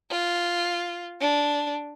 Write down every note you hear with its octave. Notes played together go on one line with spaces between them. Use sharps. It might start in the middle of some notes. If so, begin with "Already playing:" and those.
F4
D4